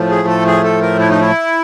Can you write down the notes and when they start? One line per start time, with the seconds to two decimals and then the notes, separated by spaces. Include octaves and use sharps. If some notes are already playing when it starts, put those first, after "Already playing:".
Already playing: A2 F3 A3
0.10 G#4
0.28 A4
0.46 G#4
0.64 A4
0.81 A#4
0.99 E4
1.10 D#4
1.21 E4